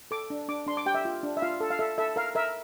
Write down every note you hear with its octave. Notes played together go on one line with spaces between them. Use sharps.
A4 D6
D4
D4 D6
D4 C6
D6
G4 G5
E5
F4
D4
E5
F4 F5
A4
F5
A4 E5
A4 E5
A#4 F5
A#4 E5